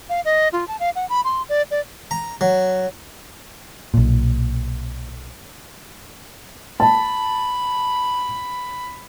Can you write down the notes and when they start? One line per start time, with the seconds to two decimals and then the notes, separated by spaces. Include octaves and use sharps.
0.09 F5
0.25 D#5
0.53 F4
0.68 A5
0.80 F5
0.96 F#5
1.09 B5
1.24 C6
1.49 D5
1.71 D5
2.11 A#5
2.41 F#3
3.94 B1 A#2
6.80 A5 B5